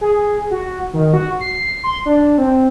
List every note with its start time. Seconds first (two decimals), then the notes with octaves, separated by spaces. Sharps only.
0.01 G#4
0.51 F#4
0.93 D#3
1.14 F#4
1.41 C7
1.83 C6
2.06 D4
2.38 C4